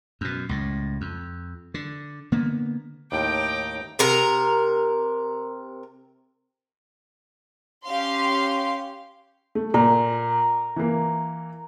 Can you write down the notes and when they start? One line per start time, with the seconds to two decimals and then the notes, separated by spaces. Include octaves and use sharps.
0.21 F#2 B2
0.49 C#2 A2
1.01 F2
1.74 D3
2.32 D3 A#3 B3
3.12 D#2 A2 D#4 G5 D6
3.99 C3 A#4 A#5
7.85 C#4 G4 F5 C6
9.55 A3
9.74 A#2 A#4
10.76 E3 A#3